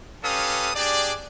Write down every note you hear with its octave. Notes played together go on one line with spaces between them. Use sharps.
C#4 G4 A4 B4 F5 D#6
D4 G4 G#4 D5